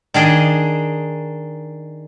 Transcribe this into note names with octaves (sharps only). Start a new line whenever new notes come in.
D#3 D4 G#4 D#5